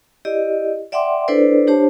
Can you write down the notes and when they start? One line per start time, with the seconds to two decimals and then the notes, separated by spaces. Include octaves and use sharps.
0.25 E4 G4 D5 D#5
0.92 D5 E5 F#5 G5 C6 D6
1.28 D4 E4 A4 B4 C5 D5
1.67 D4 G4 C5 C#5 A5